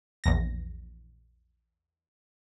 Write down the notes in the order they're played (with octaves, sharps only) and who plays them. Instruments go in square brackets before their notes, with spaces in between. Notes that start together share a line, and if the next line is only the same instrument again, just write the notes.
[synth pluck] A#1 E2 A#6